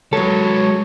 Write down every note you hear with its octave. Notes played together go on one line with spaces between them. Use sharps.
F#3 G#3 A4 B4 C#5